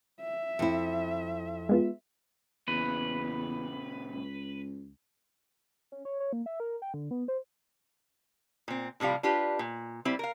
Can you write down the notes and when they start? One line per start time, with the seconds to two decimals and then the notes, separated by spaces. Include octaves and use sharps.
0.21 E5
0.59 F2 E4
1.69 G#3 B3 F4
2.68 E2 A#2 C#3 B4
4.14 C#2
5.92 C#4
6.05 C#5
6.20 C#5
6.33 A#3
6.46 E5
6.60 A#4
6.82 G5
6.94 D3
7.11 B3
7.28 C5
8.68 A#2 C4
9.00 A2 C3 F3 G3 F5
9.23 D4 F4 G4 B4
9.59 A#2
10.05 G3 C4 E4
10.19 A#4 F5